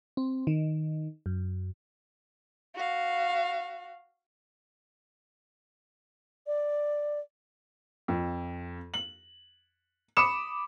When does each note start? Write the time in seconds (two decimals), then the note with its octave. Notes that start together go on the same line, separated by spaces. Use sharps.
0.17 C4
0.47 D#3
1.26 F#2
2.74 F#4 F5
6.47 D5
8.08 F2
8.94 F#7
10.17 B5 D6 D#6 C#7 E7